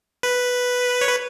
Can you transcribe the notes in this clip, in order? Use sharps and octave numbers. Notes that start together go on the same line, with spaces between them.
B4
C#5
B4